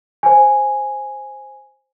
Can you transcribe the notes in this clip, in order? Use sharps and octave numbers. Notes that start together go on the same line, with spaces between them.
C5 G#5